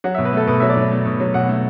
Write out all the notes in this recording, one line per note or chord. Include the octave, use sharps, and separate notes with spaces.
F#3 F#5
B2 E5
B4
A3 A4
B2 B4
F#3 E5
D5
B2
A3
B2
F#3
B2 F#5
A3